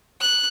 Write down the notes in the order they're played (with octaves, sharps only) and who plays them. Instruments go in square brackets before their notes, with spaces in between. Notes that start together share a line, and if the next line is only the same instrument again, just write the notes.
[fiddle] F#6